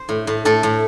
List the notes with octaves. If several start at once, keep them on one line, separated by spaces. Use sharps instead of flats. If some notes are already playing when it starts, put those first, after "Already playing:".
Already playing: C5
A2
A2
A2 A4
A2